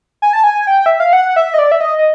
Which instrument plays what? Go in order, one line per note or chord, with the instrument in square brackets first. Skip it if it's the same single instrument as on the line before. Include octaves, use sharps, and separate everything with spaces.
[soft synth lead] G#5
A5
G#5
G5
E5
F5
F#5
E5
D#5
D5
E5
D#5
D#5